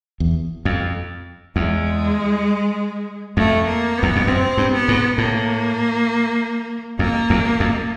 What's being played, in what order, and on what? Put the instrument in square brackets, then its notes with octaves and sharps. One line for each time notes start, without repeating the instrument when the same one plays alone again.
[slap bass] E2
F2
[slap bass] E2 [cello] G#3
[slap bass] F2 [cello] A3
[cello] A#3
[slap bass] E2 [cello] B3
[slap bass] F2
[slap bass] F#2 [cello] C4
[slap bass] G2
[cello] B3
[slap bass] G#2
[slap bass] A2 [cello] A#3
[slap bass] F2 [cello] A#3
[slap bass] E2
F2